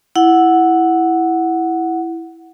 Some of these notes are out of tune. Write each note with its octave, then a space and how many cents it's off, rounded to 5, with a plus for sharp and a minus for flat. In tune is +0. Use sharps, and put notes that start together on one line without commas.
E4 +0 F#5 +0